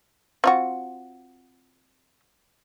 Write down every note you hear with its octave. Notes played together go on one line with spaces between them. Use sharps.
C4 F4 F#4